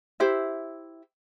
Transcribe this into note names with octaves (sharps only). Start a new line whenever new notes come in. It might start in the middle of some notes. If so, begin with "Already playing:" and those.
E4 G4 C5 E5